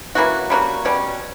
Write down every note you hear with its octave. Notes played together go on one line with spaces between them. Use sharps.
E3 A#3 C#4 F#4
G3 A#3 C#4 F#4
B2 G3 C#4